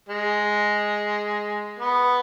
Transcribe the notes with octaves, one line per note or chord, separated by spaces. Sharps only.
G#3
B3